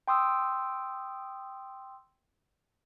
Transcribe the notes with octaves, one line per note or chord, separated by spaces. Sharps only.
G5 C6 D#6 E6